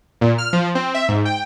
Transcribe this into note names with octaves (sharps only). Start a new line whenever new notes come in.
A#2
F6
F3
C4
E5
G#2
G5